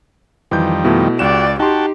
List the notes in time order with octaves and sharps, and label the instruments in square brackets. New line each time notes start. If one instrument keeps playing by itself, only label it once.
[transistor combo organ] F2 D#3 G3 [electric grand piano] E3 G6
[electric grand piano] B2 E4 [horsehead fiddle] A3
[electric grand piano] C#2 E7 [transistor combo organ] F#4 G4 [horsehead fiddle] D5
[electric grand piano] D#4 C6 [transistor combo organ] F#4 G5 A5 [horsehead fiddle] G4